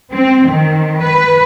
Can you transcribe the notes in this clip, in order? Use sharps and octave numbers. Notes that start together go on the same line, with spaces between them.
C4
D#3
B4